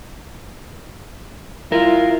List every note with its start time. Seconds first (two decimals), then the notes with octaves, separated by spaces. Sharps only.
1.72 E4 F4 A#4